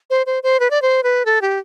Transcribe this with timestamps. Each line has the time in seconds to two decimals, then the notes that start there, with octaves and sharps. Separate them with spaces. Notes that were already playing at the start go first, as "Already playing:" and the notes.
0.10 C5
0.26 C5
0.43 C5
0.60 B4
0.71 D5
0.82 C5
1.03 B4
1.26 A4
1.42 G4